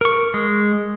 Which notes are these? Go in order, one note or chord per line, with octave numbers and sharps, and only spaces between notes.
A#4 C#6
G#3